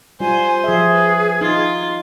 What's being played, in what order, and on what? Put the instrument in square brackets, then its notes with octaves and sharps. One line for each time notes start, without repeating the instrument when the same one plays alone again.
[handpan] G3 F4 [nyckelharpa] C5 [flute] G#5
[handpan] F3 E5 [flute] G#4
[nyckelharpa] B4
[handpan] D#4 [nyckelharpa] F4